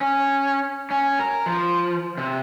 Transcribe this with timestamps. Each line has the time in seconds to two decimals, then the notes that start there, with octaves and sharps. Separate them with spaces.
0.01 C#4
0.90 C#4
1.19 A#4
1.46 F3
2.18 C3